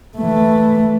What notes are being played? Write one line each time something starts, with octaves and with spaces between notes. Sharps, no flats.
E3 A3